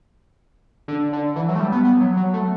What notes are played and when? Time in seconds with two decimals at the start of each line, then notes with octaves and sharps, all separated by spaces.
0.88 D3
1.13 D3
1.36 E3
1.49 F#3
1.55 A3
1.60 G3
1.72 B3
1.85 B3
2.01 F#3
2.17 F#3
2.34 A3